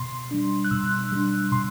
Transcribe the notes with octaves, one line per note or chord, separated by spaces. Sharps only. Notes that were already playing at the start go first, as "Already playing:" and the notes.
Already playing: B2 C6
G3 D4
F#6
B2 E6
G3 D4
B2 C6